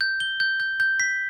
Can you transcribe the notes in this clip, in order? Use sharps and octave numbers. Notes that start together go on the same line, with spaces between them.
G6
G7
G6
G6
G6
B6